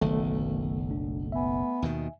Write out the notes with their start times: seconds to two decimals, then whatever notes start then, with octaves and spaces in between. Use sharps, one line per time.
0.01 F#1 B1 D#3 A3 B3
0.91 D4
1.32 B3 E5 G#5
1.82 D#2 B2 D#3